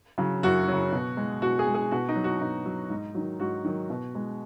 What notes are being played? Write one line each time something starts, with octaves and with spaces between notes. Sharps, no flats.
C#3 F#3
F#2 F#4
C#3 F#3
B2
G#3
B2 F#4
G#4
G#3
G#4
B2 F#4
D#4
F#3
F#4
B2 D#4
F#3
G#2
D#3 F#3
G#2 F#4
D#3 F#3
B2
G#3